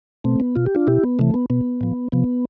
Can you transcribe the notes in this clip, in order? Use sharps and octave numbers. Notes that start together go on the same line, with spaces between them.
B2 A3 C4
B3
B2 F4
G4
D4 F4
B2 E4 G4
B3
C3 E3 A3
B3
B2 B3
A2 F3
C3 F3 B3